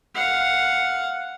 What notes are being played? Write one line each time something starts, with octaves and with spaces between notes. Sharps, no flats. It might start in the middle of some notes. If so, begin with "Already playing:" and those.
F5 F#5